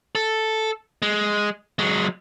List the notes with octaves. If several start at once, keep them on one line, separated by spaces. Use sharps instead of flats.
A4
G#3
F#3 G#3